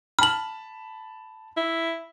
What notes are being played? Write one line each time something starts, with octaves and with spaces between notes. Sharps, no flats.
A5 B5 F6 F#7
E4